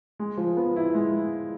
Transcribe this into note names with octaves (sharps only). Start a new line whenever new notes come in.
G#3
F3
B3
E4
G#3